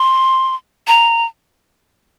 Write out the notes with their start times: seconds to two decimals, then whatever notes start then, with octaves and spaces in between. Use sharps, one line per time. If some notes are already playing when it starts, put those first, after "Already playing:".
Already playing: C6
0.87 A#5